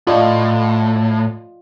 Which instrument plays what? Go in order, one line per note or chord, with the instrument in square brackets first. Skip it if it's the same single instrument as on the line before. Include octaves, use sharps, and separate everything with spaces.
[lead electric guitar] A2 [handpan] F4 D5 D#5